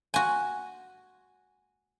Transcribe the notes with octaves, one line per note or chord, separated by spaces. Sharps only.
F#4 G#5